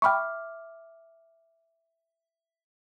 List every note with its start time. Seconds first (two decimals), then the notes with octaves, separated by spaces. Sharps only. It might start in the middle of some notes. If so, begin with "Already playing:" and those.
0.02 E5 G5 B5 C#6 D6 F6